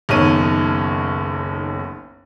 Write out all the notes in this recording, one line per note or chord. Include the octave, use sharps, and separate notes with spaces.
F#1 B1 D#3 C#5 D#7